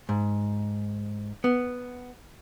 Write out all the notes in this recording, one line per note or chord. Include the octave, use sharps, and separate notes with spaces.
G#2
B3